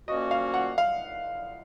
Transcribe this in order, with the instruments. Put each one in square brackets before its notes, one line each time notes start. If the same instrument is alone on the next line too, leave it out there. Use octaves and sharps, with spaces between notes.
[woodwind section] A#2 F3 A#3 C#4 F#4 [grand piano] D#5
[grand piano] F5
F#5
F5